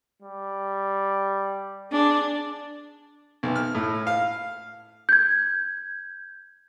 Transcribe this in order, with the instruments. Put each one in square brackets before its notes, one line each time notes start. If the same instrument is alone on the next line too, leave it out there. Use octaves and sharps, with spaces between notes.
[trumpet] G3
[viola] D4 [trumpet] G#4
[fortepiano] B1
F6
A2
F5
[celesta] G6 G#6